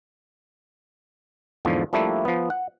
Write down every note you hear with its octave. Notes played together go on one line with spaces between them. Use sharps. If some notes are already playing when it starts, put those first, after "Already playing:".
E2 G#2 D3 F3
F3 G3 A3 A#3 D4 E4
F3 B3
F#5